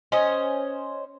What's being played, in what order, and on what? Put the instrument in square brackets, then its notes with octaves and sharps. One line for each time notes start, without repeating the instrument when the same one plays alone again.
[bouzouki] C#4 C5 D#5